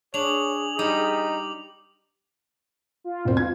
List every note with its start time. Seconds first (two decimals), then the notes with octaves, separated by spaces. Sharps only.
0.14 D4 G#4 C#5 F7 F#7
0.79 G3 D#4 D6
3.04 F4
3.25 E1 C4
3.37 F4 G#6